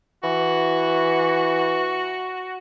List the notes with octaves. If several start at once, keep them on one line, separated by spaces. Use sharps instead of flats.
E3 F#4